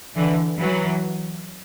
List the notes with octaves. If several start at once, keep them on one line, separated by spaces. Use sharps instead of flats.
D3 E3
E3 F#3